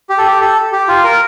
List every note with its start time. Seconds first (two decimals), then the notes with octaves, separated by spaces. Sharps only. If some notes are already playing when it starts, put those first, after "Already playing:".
0.09 G4
0.18 A4
0.27 G4
0.41 A4
0.72 G4
0.88 F4
1.04 A#4